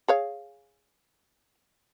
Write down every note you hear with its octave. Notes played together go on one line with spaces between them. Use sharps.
G#4 C#5 F5